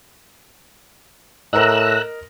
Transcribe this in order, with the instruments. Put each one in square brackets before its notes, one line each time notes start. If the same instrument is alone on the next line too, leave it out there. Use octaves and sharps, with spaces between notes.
[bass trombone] A2 [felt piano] A#4 D#5 [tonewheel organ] A#5 E6 F#6